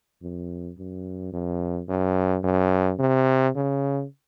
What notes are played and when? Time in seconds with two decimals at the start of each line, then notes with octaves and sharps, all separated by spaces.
0.22 F2
0.78 F#2
1.33 F2
1.89 F#2
2.44 F#2
2.99 C3
3.55 C#3